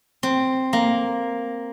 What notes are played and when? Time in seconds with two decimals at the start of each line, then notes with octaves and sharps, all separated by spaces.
0.23 C4
0.73 A#3